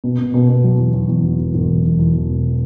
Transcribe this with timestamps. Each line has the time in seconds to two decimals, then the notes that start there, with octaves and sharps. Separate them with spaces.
0.04 B2
0.19 B2
0.34 B2
0.49 B2
0.64 F#3
0.79 E2
0.94 E2
1.09 E2
1.24 F#3
1.39 E1
1.54 E1
1.69 E2
1.84 E2
1.99 E2
2.14 E2
2.29 B2